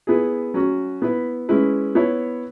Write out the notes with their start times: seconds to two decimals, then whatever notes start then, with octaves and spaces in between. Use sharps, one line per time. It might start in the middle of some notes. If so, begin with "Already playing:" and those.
0.07 B3 E4 G#4
0.54 F#3 C#4 F#4
1.02 B3 E4 B4
1.49 G#3 C#4 E4 B4
1.95 B3 E4 C#5